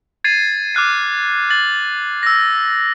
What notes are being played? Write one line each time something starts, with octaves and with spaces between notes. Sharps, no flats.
G#6 A6 C7 D#7
D6 F6 F#6 C7
A6 F#7
E6 A#6